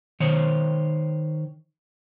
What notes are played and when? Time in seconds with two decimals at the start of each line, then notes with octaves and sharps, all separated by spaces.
0.20 D#3 C5 C#5